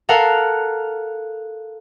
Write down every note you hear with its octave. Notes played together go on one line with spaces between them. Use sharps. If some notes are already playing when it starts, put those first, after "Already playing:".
A4 A#4 F5 F#5